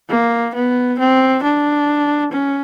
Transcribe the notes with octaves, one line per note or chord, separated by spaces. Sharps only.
A#3
B3
C4
D4
C#4